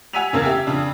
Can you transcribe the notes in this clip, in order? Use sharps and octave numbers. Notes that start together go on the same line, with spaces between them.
F#5 G#5 E6 B6 D#7 F7
F#1 E2 C#3 A#3 E6 G#6
G4 E5
F2 C#3 D4